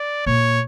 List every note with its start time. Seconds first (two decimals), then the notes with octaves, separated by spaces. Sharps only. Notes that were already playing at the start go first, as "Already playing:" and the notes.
Already playing: D5
0.26 A#2 C#5